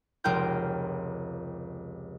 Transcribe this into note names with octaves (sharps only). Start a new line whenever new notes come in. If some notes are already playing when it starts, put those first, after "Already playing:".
F1 C#2 F4 A#4 G5 G6